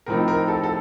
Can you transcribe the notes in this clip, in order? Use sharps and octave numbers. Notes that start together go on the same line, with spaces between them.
A2 F3 C4 D#4 A#4
A#4
A4
A4